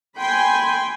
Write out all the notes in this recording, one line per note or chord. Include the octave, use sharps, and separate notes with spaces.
G5 G#5 B5 C6